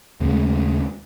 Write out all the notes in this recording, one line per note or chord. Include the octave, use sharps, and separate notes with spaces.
D#2 C#3 G#3 A3